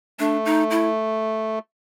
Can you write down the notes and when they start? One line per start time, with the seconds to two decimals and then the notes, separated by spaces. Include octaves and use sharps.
0.19 A3 D4
0.45 D#4
0.71 E4